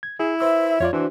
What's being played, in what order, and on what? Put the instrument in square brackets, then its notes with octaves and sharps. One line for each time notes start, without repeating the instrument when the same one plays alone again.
[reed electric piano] G#6
[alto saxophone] E4 [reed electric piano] G#4
[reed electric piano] B4 C5 E6 [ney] E5
[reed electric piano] F2 F4 D5 [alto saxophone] C#5
[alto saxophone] E3 [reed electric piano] D4 F#4 C5